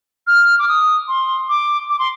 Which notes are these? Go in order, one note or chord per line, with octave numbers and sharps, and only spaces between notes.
F6
D6
D#6
C6
D6
D6
C6